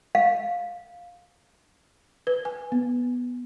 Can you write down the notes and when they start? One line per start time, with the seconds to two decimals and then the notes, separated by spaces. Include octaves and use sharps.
0.15 F5
2.27 B4
2.45 G#5
2.72 B3